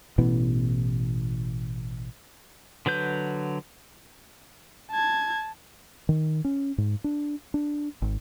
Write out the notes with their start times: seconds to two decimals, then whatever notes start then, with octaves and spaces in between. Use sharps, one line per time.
0.18 A1 B2 E3 B3
2.86 D3 F#3 B4 G6
4.91 A5 G#6
6.09 D#3
6.44 C#4
6.78 G#2
7.04 D4
7.54 D4
8.02 G#1